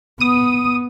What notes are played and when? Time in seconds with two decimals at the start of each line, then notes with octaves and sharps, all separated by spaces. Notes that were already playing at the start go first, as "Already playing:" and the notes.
0.20 B3 D#6 D#7